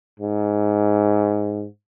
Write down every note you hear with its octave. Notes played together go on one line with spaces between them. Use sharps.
G#2